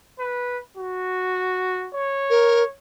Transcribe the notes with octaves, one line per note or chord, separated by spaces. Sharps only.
B4
F#4
C#5
A#4